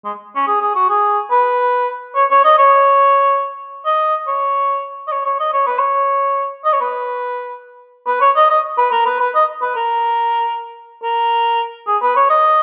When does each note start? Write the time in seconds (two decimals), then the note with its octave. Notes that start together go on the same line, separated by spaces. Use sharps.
0.05 G#3
0.36 C#4
0.47 G#4
0.61 G#4
0.75 F#4
0.89 G#4
1.31 B4
2.16 C#5
2.30 C#5
2.44 D#5
2.58 C#5
3.85 D#5
4.27 C#5
5.07 D#5
5.12 C#5
5.26 C#5
5.40 D#5
5.53 C#5
5.67 B4
5.79 C#5
6.65 D#5
6.73 C#5
6.81 B4
8.07 B4
8.21 C#5
8.36 D#5
8.50 D#5
8.78 B4
8.91 A#4
9.06 B4
9.20 B4
9.35 D#5
9.62 B4
9.76 A#4
11.03 A#4
11.87 G#4
12.02 B4
12.16 C#5
12.30 D#5